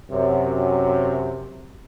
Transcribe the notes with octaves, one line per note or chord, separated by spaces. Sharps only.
F#2 C3